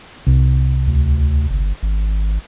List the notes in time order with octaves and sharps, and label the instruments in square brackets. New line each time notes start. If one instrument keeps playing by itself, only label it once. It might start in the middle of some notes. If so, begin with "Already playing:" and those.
[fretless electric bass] C2
[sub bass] D2
G1
G#1